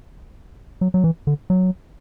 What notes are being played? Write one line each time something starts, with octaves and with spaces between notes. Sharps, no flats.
F#3
F#3
E3
D3
F#3